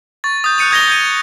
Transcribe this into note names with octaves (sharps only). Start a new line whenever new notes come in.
C#6 A6
D#6 G6
F#6 G6 C#7 D#7 F7
D#6 G#6 A#6 F7 G7
G6 G#6 D#7